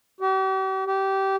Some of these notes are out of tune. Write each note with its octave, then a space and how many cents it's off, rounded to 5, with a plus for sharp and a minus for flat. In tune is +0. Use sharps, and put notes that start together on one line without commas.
G4 -45
G4 -20